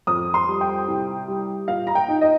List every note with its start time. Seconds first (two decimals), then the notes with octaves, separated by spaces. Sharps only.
0.07 F2 D#6
0.34 C6
0.47 G3
0.61 G5
0.88 C2
1.28 G3
1.68 A#2 F5
1.87 A#5
1.95 G5
2.08 D#4
2.21 D#5